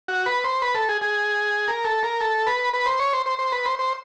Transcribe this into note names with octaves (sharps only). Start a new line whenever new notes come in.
F#4
B4
C5
B4
A4
G#4
G#4
A#4
A4
A#4
A4
B4
B4
C5
C#5
C5
C5
C5
B4
C5
C5